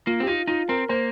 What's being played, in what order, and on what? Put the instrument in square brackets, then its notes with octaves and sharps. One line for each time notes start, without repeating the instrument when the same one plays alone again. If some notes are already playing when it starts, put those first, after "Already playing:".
[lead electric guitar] A#3 [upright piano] F4
[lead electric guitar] C4
[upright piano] G4
[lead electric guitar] D#4 [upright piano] F4
[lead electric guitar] D#4 [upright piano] F4
[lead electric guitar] C4 [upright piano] A#4
[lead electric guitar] A#3 [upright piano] C5